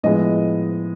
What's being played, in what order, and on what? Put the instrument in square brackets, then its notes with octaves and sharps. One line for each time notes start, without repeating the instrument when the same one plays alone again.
[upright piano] A2 F3 G#3 B3 D#5